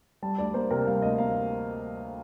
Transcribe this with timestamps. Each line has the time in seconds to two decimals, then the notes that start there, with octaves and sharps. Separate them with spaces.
0.22 G3 A5
0.38 D2 D5
0.54 A#3 C5
0.71 C3 A#4
0.86 G3 F5
1.02 D2 D#5
1.18 A#3 F5